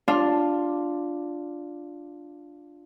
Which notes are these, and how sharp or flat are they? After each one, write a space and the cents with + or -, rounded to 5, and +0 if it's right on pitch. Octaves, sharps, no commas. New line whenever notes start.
D4 +0 F4 +0